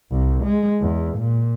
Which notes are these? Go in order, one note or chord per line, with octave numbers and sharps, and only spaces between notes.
C2
G#3
E2
A#2